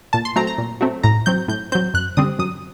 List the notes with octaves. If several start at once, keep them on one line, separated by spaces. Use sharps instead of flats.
A#2 A5
C6
F#3 A3 C4 A#5
A#5
A#2
F#3 A3 C4
A2 A#5
F#3 C4 G6
A2 G6
F#3 C4 G6
F#2 F#6
D3 G3 C4 D#6
F#2 D#6